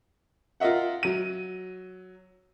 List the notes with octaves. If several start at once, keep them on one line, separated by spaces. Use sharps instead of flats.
F4 A#4 D#5 E5 F#5
F#3 D#7